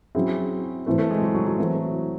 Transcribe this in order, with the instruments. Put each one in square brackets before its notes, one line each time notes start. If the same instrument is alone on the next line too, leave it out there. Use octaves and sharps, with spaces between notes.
[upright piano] F#3 C#4 E4 G#4 [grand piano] C4
[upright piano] A2 E3 C4 [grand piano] A3
[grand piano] A3
G#3
F#3
F#3
F#3
[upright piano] E3 A3 C4 F#4